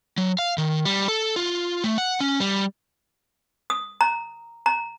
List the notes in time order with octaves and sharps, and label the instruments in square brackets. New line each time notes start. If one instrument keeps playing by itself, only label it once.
[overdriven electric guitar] F#3
F5
D#3
G3
A4
F4
A3
F#5
C#4
G3
[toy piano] D#6
A#5
A#5